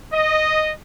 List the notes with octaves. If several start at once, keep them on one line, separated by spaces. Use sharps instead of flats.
D#5